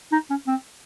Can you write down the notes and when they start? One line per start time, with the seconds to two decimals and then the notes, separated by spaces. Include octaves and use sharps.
0.12 D#4
0.30 C#4
0.47 C4